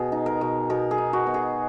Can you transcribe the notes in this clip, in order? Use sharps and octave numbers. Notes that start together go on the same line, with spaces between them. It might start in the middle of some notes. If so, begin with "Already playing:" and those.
Already playing: B2 G#4
D#4
A#4
B2
B2 A#4
G#4
D#4
F#4
B2
G#4